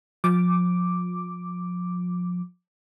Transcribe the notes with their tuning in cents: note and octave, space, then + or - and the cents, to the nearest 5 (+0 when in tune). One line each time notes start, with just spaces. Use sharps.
F3 +35 D6 +0